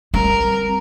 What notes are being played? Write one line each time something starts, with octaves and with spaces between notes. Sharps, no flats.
G3 C4 A#4